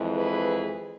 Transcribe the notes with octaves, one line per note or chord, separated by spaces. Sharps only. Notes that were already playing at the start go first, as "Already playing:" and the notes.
Already playing: F2 E3 G#3
G#4 B4